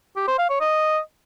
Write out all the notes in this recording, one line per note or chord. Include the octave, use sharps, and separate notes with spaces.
G4
C5
F5
C#5
D#5